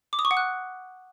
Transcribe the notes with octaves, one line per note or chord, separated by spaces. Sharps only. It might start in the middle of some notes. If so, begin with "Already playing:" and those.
D6
D#6
C#6
F#5
F#6